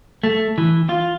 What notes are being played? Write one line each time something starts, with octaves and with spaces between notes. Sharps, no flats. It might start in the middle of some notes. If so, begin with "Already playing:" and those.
A3
E3
F4